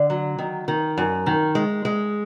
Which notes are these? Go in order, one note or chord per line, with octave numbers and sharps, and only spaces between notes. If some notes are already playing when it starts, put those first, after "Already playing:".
Already playing: D3
F#3
D#3
D#3
F#2
D#3
G#3
G#3